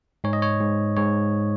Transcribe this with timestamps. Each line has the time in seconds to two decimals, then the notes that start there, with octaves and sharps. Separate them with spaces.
0.24 G#2 C#5
0.33 D#5
0.42 C#5
0.61 G#2
0.97 G#2 C#5